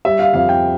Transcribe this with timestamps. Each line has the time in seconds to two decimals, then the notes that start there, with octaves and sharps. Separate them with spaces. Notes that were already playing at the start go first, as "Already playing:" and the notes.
0.05 G3 E5
0.19 F5
0.34 F2 F5
0.49 G5